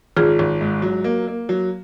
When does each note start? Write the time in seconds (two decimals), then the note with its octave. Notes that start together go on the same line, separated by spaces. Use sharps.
0.17 G#1 F4 G#4
0.39 G#1
0.61 G#2
0.82 F#3
1.04 A#3
1.28 A#3
1.49 F#3